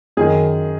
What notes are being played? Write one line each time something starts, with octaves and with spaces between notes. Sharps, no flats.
F#2 D#3 G#4